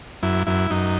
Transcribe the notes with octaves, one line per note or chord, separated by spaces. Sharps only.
F#2 E4
F#2 E4
F#2 D#4